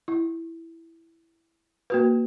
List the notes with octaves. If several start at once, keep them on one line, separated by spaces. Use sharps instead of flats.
E4
A#3 F#4 B4